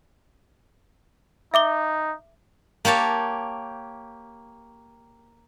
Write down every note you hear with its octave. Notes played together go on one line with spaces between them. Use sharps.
D#4 E5 D6 G7
A#3 G4 C#5 A5